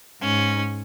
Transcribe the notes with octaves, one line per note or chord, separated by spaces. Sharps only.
G#2 C#4